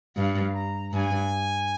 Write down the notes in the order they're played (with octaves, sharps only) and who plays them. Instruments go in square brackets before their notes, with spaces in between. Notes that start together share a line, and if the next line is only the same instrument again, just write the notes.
[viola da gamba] G2 [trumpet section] F5
[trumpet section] A#5
[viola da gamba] G2 [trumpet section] G#5